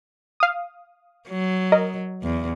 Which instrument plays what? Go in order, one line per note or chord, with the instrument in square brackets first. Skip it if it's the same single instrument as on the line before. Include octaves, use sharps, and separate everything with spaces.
[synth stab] F5 D#6
[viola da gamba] F#3
[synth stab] A#4 D#5
[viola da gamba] E2